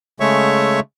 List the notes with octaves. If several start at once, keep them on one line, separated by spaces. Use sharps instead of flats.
C#3 G#3 A3 C#5 E5 C#6